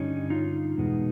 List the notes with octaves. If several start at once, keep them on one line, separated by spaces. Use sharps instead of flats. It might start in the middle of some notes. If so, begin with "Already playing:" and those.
Already playing: G2 D3 G3 C#4 D#4
D#4 F4
E2 B2 G#3 B3